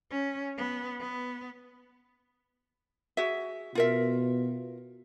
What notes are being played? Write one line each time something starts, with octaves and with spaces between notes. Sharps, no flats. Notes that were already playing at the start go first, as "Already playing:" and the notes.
C#4
B3
B3
F#4 G#4 E5
B2 F4 A#4 E5